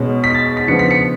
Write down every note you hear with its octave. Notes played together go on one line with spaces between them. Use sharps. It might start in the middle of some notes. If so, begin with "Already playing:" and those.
Already playing: B2 G#3 C#4
B6
A6
B6
B6
C#3 F3 B3 D4 C#7
B6
C#7